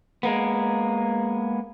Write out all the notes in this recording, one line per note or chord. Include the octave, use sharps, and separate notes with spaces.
G#3 A#3 B3